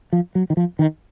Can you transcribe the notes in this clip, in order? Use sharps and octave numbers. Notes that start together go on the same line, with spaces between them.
F3
F#3
D#3
F3
D#3